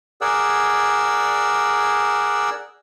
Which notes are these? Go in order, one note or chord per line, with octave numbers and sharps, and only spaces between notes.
G#4 A#4 D5 F#5 E6